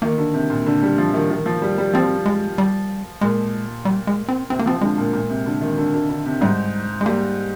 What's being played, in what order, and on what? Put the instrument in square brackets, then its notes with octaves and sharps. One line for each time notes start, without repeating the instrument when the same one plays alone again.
[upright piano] D#3 [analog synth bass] A#3
[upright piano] D3
C3
A#2
D3
G3
F3
D#3
D#3
F3
G3
G3
[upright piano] F3 [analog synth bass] C4
[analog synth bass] G#3
G3
[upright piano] A#2 [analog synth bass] G#3
[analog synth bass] G3
G#3
C4
[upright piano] C3 [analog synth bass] C4
[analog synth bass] A#3
[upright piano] F3 [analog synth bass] C4
[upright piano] D3 [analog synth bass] G#3
[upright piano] A#2
A#2
C3
D3
D#3
D3
D3
D3
C3
[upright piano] G#2 [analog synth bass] G3
[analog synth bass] G#3
[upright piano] G3 [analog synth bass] A#3